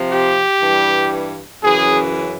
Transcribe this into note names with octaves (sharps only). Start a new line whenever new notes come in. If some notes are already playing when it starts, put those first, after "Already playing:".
Already playing: C3 F3
G4
G2 E3 G3
F#2 C#3 E3 G#4